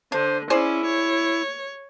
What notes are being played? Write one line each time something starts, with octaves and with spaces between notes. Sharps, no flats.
D3 D4 C5
C#4 E4 G#4 C5 D5
C#5